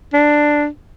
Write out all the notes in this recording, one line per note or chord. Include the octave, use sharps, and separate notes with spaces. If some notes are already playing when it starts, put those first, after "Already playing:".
D4